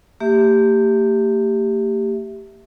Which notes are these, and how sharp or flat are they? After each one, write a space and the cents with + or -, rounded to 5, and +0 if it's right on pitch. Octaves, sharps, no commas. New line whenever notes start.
A#3 -45 G4 +0 E5 +0